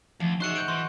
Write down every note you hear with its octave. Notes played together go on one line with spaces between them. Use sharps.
D2 F3
D#4 F#4 G#4 C5 E5 C#6 F#6 C#7
C#6 G6 D7
E3 C6